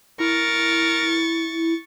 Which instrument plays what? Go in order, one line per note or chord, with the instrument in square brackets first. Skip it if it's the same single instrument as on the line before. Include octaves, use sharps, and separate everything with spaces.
[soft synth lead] E4 [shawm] A#4 [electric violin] C#6 A6